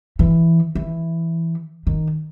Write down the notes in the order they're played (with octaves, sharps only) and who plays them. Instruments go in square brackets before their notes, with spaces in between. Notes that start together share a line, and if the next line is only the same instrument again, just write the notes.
[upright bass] E3
E3
D#3